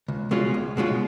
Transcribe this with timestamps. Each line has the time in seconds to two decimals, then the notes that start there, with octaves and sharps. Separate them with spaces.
0.08 C#2
0.31 B2 G#3 C#4 F4
0.54 C#2
0.77 B2 G#3 C#4 F4